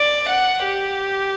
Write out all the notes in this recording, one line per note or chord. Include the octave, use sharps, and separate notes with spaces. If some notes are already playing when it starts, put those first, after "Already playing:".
Already playing: D5
F#5
G4